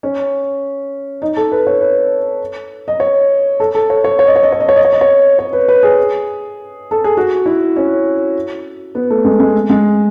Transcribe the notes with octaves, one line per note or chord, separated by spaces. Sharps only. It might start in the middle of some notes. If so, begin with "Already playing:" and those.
C#4
D#4
A4
B4
C#5
B4
D#5
C#5
A4
A4
C#5
C#5
C#5
D#5
C#5
D#5
C#5
D#5
C#5
D#5
C#5
D#5
C#5
C#5
B4
B4
G#4
A4
G#4
F#4
E4
C#4
B3
A3
G#3
G#3
G#3